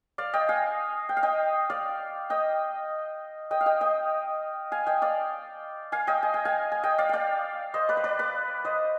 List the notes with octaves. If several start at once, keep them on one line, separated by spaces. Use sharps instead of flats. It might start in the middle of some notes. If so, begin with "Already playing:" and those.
D5 F5
D#5 G5
F5 G#5
G5
F5
D#5 G5
D5 F5
D#5 G5
D#5 G5
F5
D#5 G5
D#5 G5
F5 G#5
D#5 G5
D5 F5
F5 G#5
D#5 G5
G#5
G5
F5 G#5
G#5
D#5 G5
D5 F5
D5 F5 G5
C5 D#5
B4 D5
C5
B4 D5
B4 D5
C5 D#5